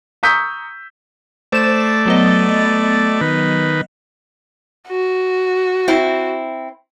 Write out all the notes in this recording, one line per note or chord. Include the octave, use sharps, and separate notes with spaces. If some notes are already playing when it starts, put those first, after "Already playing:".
A#5 C#6 D#6 E6 G6 B6
A3 C5 D5 E7
F#3 B3 D#5
D#3 B4
F#4
C4 E4